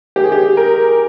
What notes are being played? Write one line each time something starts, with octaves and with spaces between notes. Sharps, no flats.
D#3 G#3 G4
G#4
G4
A#4